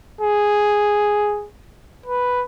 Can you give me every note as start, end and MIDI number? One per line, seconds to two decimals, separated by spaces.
0.21 1.47 68
2.06 2.45 71